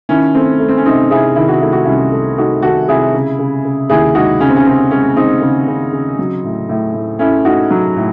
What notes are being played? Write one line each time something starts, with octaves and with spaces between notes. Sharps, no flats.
D#3 C#4 E4
A3 C4
A3
C4
C#4
C3 C4 D#4
C3 E4 G#4
D#3 E4
F#4
A3 E4
F#4
C2 C#4 E4
A3
A3 D#4 F#4
D#3 F#4 A4
C3 E4 G#4
C#3
C#3
C#3
D#2 E4 G#4
G#3 D#4 F#4
C#3 C#4
C4
C#4
C#3 C4
G#3 C#4
G#3 C4 D#4
C#3
C#3
C#3
F#3
A2
A2
A2
A3 C#4 E4
A3 D#4 F#4
F#3
A2